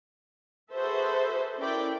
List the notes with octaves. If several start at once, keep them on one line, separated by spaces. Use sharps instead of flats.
F#4 G#4 A4 B4 C5 E5
C#4 E4 A4 A#4 D5 G5